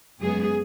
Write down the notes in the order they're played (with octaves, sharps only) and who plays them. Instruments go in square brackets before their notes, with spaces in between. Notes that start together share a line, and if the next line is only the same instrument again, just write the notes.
[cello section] F#2 C#3 G#3 B3 G#4